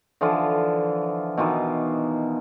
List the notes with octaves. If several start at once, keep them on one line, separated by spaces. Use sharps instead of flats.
D3 E3 F3 F4
B2 D#3 E3 F4